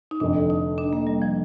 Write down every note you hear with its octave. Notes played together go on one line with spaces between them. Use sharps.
D#4
F1 F2 D3 D4
D#4
D4
A#3
G3
F3